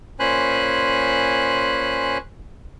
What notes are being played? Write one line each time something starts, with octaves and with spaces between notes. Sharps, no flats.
A#2 C#4 C5 G#5 B5 F#6